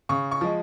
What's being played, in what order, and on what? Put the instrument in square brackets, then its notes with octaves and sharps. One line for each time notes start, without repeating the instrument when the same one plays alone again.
[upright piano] C#3 C#6
C#6
F3 G#3